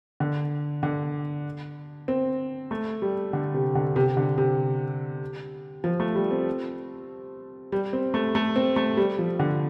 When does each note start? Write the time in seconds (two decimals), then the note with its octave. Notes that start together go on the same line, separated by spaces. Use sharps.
0.20 D3
0.83 D3
2.08 C4
2.71 A3
3.02 G3
3.33 D3
3.54 C3
3.75 D3
3.96 C3
4.17 D3
4.38 C3
5.84 F3
6.00 A3
6.15 G3
6.31 C4
7.72 G3
7.93 C4
8.14 A3
8.35 A3
8.56 C4
8.76 A3
8.97 G3
9.19 F3
9.39 D3